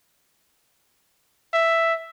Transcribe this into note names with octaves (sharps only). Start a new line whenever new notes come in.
E5